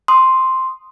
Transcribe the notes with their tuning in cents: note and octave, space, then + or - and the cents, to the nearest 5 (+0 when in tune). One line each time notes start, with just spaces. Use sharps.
C6 +0 D#6 +0